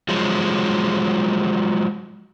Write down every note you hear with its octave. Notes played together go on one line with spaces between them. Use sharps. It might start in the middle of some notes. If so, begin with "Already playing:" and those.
F3 F#3 G#3